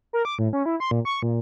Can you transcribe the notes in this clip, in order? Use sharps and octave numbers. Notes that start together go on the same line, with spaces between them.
A#4
D6
A2
C#4
E4
C6
A#2
C#6
A#2